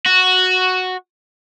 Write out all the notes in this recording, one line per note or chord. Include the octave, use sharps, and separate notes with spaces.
F#4